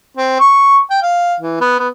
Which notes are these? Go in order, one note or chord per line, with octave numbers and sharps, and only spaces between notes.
C4
C#6
G5
F5
E3
B3
B3